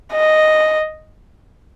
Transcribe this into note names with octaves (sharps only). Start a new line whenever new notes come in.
D#5